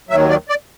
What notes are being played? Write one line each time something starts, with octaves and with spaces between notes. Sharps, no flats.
D#2 D#3 F#3 E5
D5
D5